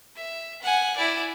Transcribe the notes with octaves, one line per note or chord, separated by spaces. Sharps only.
E5
F#5 G#5
E4 D5